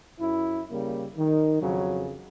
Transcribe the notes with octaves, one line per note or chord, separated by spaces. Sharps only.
F#2 E4
C#3 G3 A#3
D#3
F2 C#3 F#3